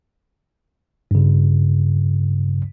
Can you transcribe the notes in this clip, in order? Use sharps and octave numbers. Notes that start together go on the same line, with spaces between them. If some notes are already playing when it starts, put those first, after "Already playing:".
G2 C#3